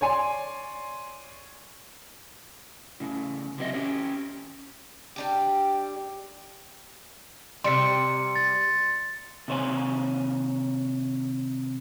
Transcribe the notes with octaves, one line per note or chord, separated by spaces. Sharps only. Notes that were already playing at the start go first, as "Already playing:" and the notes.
C#5 D5 G#5 C6
A2 C#3
C3 F#3 A#3 C#4 D#5 E5
C#4 G4 C#5
G3 D4 G4
C3 G3 C6 C#7
A6
C3 D#3 C5 C#5 G#5